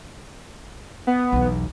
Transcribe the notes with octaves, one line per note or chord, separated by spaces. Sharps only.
B3
B1 E2